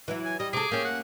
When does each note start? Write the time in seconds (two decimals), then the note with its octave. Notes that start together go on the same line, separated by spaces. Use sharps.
0.08 E3 F#3 E4
0.25 G#5
0.40 G3 D#5
0.53 C3 G#4 A4 D6
0.71 A#3 C#4 G4
0.85 F#5